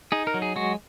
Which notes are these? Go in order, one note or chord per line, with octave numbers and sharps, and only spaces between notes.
D#4 G#4
A#4
F#3
G#4
G#3 F#4